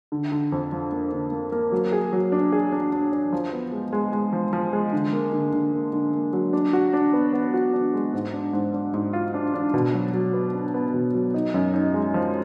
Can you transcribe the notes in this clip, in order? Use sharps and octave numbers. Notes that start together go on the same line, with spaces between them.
D3
D3
F2
F3
A#3
D3
A#3
A#3
F#3
G#4
F#3
D4
G#4
D4
D4
D4
F3
B3
G#3
G#3
G#3
F3
F3
G#3
D3
A#3
D3
D3
A#3
D3
A#3
F#3
D4
F#4
D4
B3
B3
F#4
D4
G#3
G#2
D4
G#2
D4
G#2
F4
D4
D4
B2
F#3
F#3
B3
D4
B3
B2
F#3
D#4
F#2
D#4
G#3
F3